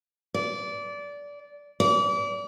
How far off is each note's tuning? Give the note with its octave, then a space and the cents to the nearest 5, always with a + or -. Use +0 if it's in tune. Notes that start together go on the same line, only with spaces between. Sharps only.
D5 -20
D5 -35